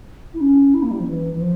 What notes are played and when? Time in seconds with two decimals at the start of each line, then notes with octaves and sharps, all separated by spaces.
0.34 E4
0.40 C#4
0.74 E4
0.82 A#3
0.91 G3
0.99 F3
1.07 E3
1.33 E3
1.40 F3